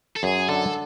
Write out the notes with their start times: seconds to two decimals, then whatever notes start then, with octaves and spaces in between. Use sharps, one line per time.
0.16 A4
0.23 F#2 G#4
0.49 D3 A4